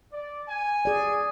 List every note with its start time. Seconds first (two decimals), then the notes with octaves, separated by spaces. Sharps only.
0.12 D5
0.48 G#5
0.85 G#4 D5